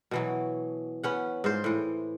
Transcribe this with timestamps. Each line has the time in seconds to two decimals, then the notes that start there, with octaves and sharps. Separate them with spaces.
0.11 B2 E3 F#3
1.03 B3 C#4 F#5
1.44 G#2 F4 C5
1.64 A2 E3